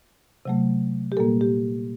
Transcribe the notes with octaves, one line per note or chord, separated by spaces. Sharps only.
C3 F#3 A3
G4
A#2 G3 A#3 A4
G4